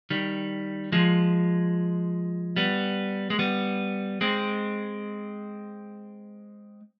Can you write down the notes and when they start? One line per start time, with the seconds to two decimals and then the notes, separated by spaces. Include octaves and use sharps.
0.10 D#3 G3
0.92 F3 G#3
2.56 G3 B3
3.30 G#3
3.39 G3 B3
4.21 G#3 C4